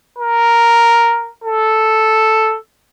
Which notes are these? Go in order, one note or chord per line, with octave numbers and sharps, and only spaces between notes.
A#4
A4